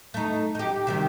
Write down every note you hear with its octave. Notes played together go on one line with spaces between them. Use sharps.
A3 D#4
D#4 G4
C3 D#3 G3